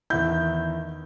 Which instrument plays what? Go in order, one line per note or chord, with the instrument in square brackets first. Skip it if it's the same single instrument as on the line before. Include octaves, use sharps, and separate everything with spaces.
[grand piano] E2 D#3 E5 [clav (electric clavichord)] E4 [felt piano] G6